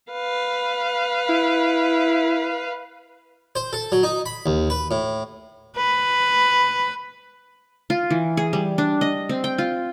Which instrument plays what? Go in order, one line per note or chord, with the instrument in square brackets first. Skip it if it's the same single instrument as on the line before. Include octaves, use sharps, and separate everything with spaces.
[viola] B4 F5
[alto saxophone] E4
[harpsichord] C5
A4
F#3
D#4
B5
D#2
B4
A2
[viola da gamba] B4
[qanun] F4
E3
G#4
G3
D4
D#5
C4
G5
F4